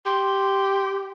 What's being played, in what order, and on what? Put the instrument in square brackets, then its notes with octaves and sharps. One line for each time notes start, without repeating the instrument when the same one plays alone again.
[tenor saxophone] G4 [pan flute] C6